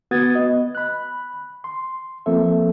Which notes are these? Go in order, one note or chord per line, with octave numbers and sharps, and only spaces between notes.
B3 F#4 B4 D#6 G#6 A6
B3 D#5
B5 F#6
C6
F3 A#3 C4 A4 E5